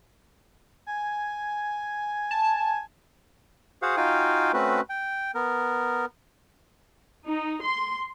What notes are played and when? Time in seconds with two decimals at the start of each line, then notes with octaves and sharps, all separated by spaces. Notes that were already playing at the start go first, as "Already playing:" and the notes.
0.87 G#5
2.31 A5
3.82 F#4 G#4 C5 F5 F#5
3.97 D#4 F4 F#4 F5 G5 G#5
4.53 A3 C4 C#4 F#4 B4
4.89 G5
5.35 B3 A#4
7.25 D#4
7.61 C6